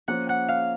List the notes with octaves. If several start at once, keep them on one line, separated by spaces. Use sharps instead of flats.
F3 A#3 C#4 F#5
F#5
F5